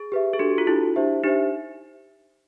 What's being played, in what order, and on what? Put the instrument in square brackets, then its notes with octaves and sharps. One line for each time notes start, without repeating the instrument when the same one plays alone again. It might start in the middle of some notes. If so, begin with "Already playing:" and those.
Already playing: [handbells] G#4
[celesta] G4 B4 E5
[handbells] G#4
[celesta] D4 F#4 A4 [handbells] G4
[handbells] F4
[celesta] D4 F#4 A4 [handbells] E4
[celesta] D4 G4 C5 E5
[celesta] D4 G4 C5 E5 [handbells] D#4